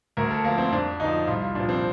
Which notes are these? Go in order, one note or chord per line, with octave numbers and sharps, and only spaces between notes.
D2 A#4
A4
D3 F3 A#3
C4
F2 D4
D3 F3 D#4
C2 F4
F4
A#2 F3 D4
C4